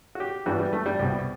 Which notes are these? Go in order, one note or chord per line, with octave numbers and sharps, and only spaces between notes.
F#4
G4
G2 E3 G3 F#4
G3
A3
G3
C2 B2 G3